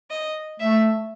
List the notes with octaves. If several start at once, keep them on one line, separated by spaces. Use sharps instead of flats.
D#5
A3 E5